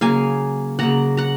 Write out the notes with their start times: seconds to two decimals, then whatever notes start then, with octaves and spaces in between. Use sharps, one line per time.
0.01 C#3 F#3 A#3 F5 G#5
0.79 C#3 F#3 A#3 F#5 A#5
1.17 F#5 A#5